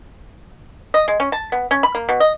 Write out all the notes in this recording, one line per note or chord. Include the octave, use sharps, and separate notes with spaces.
D#5
G#3
C#4
A5
B3
C#4
B5
A#3
B2
D#5